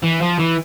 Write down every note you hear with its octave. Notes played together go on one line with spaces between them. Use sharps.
E3
F3
E3